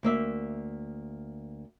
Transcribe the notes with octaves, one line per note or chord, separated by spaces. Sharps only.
D2 A#3 E5